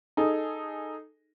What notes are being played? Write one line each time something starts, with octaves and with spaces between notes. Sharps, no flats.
D#4 G#4 A4